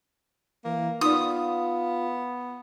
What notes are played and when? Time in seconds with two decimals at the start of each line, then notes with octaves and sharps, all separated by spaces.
0.65 E3 A#3
1.01 B3 D#4 F4 D5 D#6